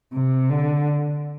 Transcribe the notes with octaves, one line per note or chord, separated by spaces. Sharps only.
C3
D3